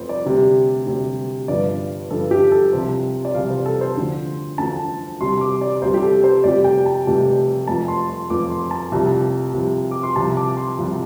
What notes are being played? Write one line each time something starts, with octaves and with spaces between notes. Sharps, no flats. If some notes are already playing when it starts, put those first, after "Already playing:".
Already playing: F1 F2 F3 C5
D5
D2 C3 G3
D2 C3 G3
G1 G2 F3 D5
G1 G2 F3 A4
G4
A4
C2 C3 F3 C5
D5
C2 C3 F3 F5
C5
A4
C5
D2 D3 F3
D2 D3 F3 A5
C2 C3 G3 C6
D6
D5
C2 C3 G3 C5
G4
A4
C5
F1 F2 C3 G3 D5
G5
A5
F1 F2 C3 G3
F1 F2 F3 A5
C6
C6
F1 F2 F3 D6
C6
A5
C2 C3 F3
C2 C3 F3
D6
C6
C2 C3 F3 A5
D6
C6
C2 C3 F3